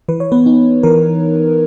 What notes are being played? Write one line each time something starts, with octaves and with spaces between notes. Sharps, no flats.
E3 B4
C#5
B3 B4
B3 D#4
E3 A#4